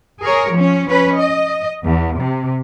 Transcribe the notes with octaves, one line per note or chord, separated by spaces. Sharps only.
G#4 A#4 C#5
F3 C#4
C#4 B4
D#5
E2
C3